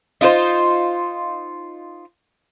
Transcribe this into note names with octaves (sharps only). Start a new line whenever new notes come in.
D#4 F4 B4 C5